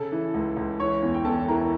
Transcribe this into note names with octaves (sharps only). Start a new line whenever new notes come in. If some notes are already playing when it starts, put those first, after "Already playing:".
Already playing: C#3 A4 A5
E3
C#2
C#2
E3 C#5 C#6
E2
G5
E2 A4 A5
E3 A#4 A#5